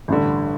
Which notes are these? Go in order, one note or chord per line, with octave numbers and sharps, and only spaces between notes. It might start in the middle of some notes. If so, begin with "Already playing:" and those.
A1 G2 D3